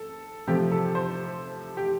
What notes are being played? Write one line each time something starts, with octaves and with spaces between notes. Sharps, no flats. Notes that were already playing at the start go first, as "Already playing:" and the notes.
Already playing: A4
C3 F3 A3 G4
A4
C5
G4